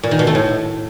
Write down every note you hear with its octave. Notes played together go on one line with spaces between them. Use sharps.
A#2
D#3
B2
A3
A2